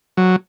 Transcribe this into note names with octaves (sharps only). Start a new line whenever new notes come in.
F#3